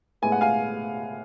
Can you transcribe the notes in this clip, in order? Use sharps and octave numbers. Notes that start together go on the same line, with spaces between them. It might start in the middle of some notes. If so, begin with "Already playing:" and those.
A2 G#3 B3 G#5
F#5
F5 G#5